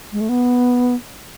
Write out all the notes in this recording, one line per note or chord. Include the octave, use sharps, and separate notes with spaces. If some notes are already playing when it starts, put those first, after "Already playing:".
G#3
A3
B3